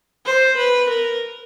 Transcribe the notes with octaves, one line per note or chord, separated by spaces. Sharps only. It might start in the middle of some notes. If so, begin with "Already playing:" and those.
C5
B4
A#4